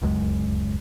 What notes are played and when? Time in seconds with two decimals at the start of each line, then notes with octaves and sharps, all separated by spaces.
0.02 D1 C#2 F#2 G#3